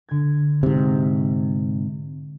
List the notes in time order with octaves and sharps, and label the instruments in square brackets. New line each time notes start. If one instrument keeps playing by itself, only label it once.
[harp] D3 G#6
[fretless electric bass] G#2 C3